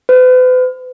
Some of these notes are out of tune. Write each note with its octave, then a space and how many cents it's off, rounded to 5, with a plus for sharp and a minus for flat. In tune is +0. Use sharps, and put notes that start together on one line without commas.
B4 +45